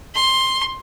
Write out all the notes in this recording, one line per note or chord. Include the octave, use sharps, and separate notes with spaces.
C6